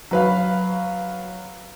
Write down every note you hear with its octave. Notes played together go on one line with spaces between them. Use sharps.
F#3 B4 F5